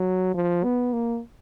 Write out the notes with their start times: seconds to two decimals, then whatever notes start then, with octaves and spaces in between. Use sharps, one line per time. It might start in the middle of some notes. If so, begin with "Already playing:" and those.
Already playing: F#3
0.34 F3
0.64 B3
0.93 A#3